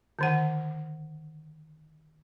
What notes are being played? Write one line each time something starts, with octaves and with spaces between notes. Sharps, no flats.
D3 D#3 F#5